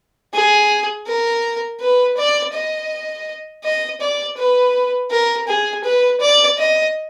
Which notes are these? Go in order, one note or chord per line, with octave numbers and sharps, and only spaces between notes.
G#4
A#4
B4
D5
D#5
D#5
D5
B4
A#4
G#4
B4
D5
D#5